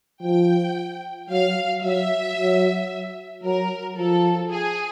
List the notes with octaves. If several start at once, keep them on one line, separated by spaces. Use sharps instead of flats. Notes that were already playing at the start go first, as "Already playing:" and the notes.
F3 G5
F#3 F5
F#3 E5
F#3
F#3 A#4
F3 A4
G#4